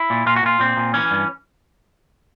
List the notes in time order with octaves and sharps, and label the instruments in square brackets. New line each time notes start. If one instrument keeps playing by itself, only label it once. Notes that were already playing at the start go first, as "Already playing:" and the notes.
Already playing: [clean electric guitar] E4
A#2
A#2 F4
F#4
A#2 F4
A#2 C4
A#2
E3 C#4
G2